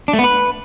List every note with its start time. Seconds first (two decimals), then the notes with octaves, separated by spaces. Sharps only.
0.08 D4
0.13 A3
0.19 B3
0.24 B4